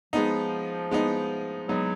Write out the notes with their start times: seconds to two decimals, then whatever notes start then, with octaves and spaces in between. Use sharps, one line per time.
0.13 F3 G#3 B3 D#4
0.91 G#3 B3 D#4
1.69 F#3 G#3 B3 D#4